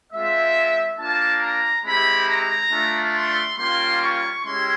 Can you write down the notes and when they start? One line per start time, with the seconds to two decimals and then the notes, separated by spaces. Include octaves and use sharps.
0.12 G#3 C4 F4 E5
0.99 A#3 D4 F4 A5
1.42 A#5
1.85 G#3 C4 E4 G4 B5
2.29 A#5
2.72 A3 D4 F4
3.15 C6
3.58 G3 A#3 C#4 F4 C6
4.02 C#6
4.44 G#3 C#4 E4 G4 C6